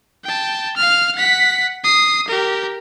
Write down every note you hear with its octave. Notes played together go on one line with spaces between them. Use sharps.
G5 A5
F5 F6
F#5 B6
D#6 C7
G4 A#4